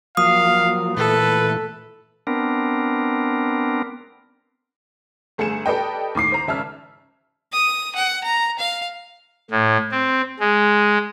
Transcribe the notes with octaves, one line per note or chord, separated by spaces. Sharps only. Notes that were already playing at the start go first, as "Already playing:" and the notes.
F3 F#3 A#3 F5 D#6
A#2 E3 A3 A4 B4
B3 C4 D4 A#4
G1 A3 G#4 G#5 C#7 E7
G4 A4 B4 D5 D#5 G5
D#2 A2 D6 C7
C5 A#5
G#1 C#3 E5 A5 E6 F6
D#6
F#5
A#5
F5
A2
C4
G#3